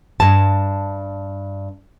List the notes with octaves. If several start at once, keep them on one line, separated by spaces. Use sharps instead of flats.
G2 A5